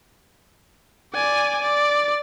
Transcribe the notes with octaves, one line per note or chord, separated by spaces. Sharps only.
D5 G#5
D5